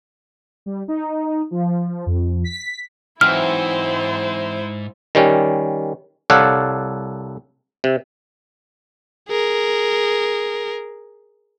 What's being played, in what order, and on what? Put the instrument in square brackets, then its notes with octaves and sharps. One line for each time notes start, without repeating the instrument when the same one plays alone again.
[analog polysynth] G3
D#4
F3
F2
B6
[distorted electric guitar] G#2 [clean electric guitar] E3 F#3 C4 [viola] E4 C5 [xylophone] F6
[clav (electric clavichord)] D#3 G3 C#4
C2 A4 C#5 D5 F5 F#5
C3
[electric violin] G#4 A#4